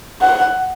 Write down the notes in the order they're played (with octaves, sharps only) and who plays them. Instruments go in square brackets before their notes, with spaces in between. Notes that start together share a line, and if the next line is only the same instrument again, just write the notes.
[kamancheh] F#5